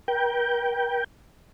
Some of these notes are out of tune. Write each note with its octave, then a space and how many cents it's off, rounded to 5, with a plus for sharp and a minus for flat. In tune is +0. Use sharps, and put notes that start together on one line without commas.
A#4 +45 G5 +0